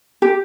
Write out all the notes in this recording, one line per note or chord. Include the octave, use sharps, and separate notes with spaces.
G4